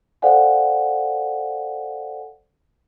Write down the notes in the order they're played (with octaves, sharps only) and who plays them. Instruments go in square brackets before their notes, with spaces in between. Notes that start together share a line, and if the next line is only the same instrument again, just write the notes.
[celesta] A4 C5 D5 F5 F#5 G#5